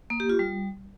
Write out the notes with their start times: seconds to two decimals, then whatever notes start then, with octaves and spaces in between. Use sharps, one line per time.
0.10 A#3
0.20 G4
0.30 F4
0.39 G3